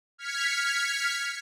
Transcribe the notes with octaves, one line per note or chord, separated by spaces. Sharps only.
F6 G#6 B6 C#7